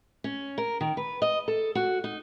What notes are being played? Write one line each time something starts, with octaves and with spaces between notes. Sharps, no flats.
C#4
A#4
D#3
B4
D#5
A4
F#4
D#4